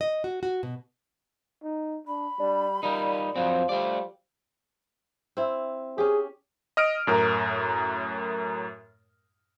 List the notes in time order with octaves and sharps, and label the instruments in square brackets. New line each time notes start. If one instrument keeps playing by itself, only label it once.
[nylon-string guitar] D#5
F#4
F#4
B2
[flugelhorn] D#4
[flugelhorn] D4 [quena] B5
[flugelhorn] G3 [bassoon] D4
[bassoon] A#2 [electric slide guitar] G3 D#4 [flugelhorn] D5
[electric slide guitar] F2 F#3 C4 [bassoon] F3
[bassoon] F3 [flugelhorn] G3 [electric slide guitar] A3 D5
[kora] C4 E4
[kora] C#4 G4 [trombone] G#4
[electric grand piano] D#5 F6 D7
F#2 A2 A#4